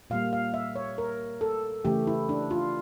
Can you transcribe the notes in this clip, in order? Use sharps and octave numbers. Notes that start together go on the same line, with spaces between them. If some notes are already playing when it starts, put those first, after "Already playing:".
A#2 G3 A#3 F5
F5
E5
C#5
A#4
A4
C#3 E3 A3 G4
E4
D4
F4